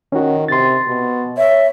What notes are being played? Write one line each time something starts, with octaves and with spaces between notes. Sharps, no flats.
D#3 C#4 F#4
C3 C6 A6
B2
C#5 E5